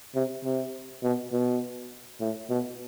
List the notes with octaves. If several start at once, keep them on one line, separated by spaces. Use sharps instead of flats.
C3
C3
B2
B2
A2
B2